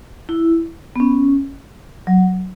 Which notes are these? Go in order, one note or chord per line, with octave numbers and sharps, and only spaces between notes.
E4
B3
C#4
F#3